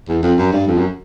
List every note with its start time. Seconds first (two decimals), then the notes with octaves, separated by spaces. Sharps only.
0.09 E2
0.23 F2
0.38 F#2
0.53 G2
0.68 F2
0.78 F#2